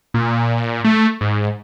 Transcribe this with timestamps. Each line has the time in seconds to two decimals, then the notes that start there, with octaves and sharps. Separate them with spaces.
0.14 A#2
0.84 A3
1.21 G#2